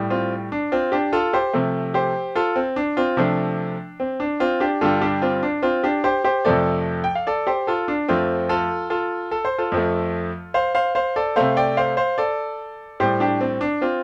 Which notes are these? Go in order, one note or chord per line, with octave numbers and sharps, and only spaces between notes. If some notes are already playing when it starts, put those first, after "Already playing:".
Already playing: A2 G3
C4 F4
D4
C4 F4
D4 G4
F4 A4
G4 C5
C3 F3 A3
G4 C5
F4 A4
C4
D4
C4 F4
C3 F3 A3 D4
C4
D4
C4 F4
D4 G4
G2 D3 G3 F4 A4
D4 G4
C4 F4
D4
C4 F4
D4 G4
G4 C5
G4 C5
F2 C3 F3 A3 A4 D5
G5
F5
A4 D5
G4 C5
F4 A4
D4
F2 F3 A3 C4 F4
F4 A4
F4 A4
A4
C5
F4 A4
F2 F3 A3
C5 F5
C5 F5
C5 F5
A4 D5
C3 A3 C5 F5
D5 G5
C5 F5
C5 F5
A4 D5
A2 G3 G4 C5
D4 G4
C4
D4
C4 F4